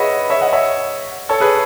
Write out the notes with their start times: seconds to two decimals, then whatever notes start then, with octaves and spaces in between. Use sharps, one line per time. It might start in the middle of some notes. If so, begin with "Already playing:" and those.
Already playing: G#4 B4 C#5 D#5 E5 F#5
0.30 C#5 E5
0.41 D#5 F#5
0.53 C#5 E5
1.29 A4 C#5
1.40 G#4 B4